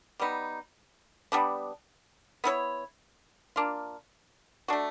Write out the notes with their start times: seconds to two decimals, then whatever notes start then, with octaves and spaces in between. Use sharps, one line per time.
0.19 G3 B3 D#4
1.32 G3 B3 D4
2.44 B3 E4 A4 C#5
3.56 A#3 D4 F4
4.68 A3 D4 F#4